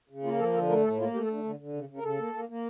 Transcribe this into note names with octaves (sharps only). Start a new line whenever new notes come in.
C#3
A#3 F4
F3 A4
D3 A4
A3 A#4
A2 A4
A#3 F4
A3 G4
A4
D3
D3
D3
C#3
C#3
A#4
C#3 A4
A#3
A#3
A#3